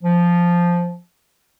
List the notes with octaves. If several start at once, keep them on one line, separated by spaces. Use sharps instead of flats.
F3